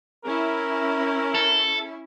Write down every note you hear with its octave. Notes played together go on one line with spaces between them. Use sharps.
C#4 E4 A#4
A4